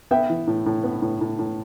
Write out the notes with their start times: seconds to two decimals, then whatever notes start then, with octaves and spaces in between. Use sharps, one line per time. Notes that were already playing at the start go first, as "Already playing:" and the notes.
0.11 B3 E5 G5
0.30 E3
0.47 A2
0.66 A2
0.84 B3
1.02 A2
1.21 A2
1.39 A2